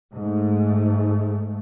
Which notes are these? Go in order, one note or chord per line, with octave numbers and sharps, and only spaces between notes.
G#2 A3